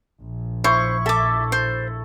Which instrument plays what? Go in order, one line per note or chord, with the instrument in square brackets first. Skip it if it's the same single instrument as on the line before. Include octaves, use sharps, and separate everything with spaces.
[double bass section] A#1
[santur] E4 C#6 [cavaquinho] C5
[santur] A4 [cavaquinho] E5 D6
[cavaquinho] C5